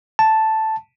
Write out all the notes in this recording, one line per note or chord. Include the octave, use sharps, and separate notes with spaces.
A5